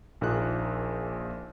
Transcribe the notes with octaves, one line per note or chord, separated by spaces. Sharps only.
A#1 A#2 A#3 D#4 G#4 F#6